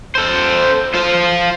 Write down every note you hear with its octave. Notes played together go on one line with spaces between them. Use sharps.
A4 C5
F4 C5